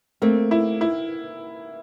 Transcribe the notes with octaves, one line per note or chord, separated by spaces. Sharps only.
A3 A#3 C4
E4
E4